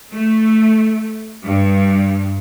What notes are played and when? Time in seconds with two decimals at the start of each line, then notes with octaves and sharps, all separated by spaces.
0.12 A3
1.43 G2